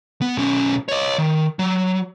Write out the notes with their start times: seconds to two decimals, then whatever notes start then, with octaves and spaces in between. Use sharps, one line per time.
0.21 B3
0.37 B1 C#4
0.89 C#5 D#5
1.18 D#3
1.59 F#3